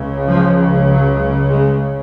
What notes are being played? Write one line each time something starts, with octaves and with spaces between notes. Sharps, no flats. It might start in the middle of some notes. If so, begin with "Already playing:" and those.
Already playing: C#2 C#3
F3
F#3
G#3